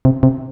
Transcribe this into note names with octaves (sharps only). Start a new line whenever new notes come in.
C3
C3